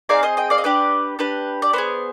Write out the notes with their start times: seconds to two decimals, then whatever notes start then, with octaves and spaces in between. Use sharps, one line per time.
0.09 C4 D#4 G#4 D5 F5
0.23 C5 D#5
0.37 D#5 G5
0.50 D5 F5
0.58 D#5
0.64 D4 G4 B4 D5
1.19 D4 G4 B4
1.62 D5
1.73 B3 D#4 G#4 C5